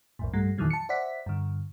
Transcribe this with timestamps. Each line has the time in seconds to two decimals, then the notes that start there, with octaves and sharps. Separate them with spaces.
0.19 B1 F2 A2
0.33 G2 G3 A3
0.58 F2 A#2 D#3 E3 F#3 A3
0.70 A5 C#7
0.89 C5 D5 E5 F#5 B6
1.26 G2 D3